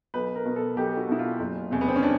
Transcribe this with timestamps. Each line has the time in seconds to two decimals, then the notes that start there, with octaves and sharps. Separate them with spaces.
0.14 B1 B4
0.35 A#4
0.45 B2
0.56 A4
0.76 B1 G4
0.97 F#4
1.08 B2 E4
1.19 F4
1.40 F#1
1.71 E2 C3
1.81 B3
1.88 C4
1.96 C#4
2.03 D4